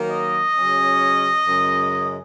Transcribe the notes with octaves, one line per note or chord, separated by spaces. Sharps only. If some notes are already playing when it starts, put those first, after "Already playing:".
Already playing: D#3 F#3 A#3
D#5
C#3 F#3 C#4
F#2 C#3 G#3